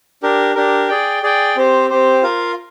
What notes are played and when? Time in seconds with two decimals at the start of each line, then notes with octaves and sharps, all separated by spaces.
0.23 D4 G4 A#4
0.55 D4 G4 A#4
0.89 G#4 D5 G5
1.23 G#4 D5 G5
1.56 C4 G4 C5
1.90 C4 G4 C5
2.22 F4 A#4 F5